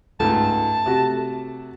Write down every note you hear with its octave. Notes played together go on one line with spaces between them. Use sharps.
C#2 G#2 A3 A5
C3 F#4